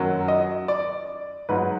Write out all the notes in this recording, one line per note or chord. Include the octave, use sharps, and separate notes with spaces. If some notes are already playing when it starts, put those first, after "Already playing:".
Already playing: F#2 D#3 F#3
D#5
D5
G#2 F#3 B4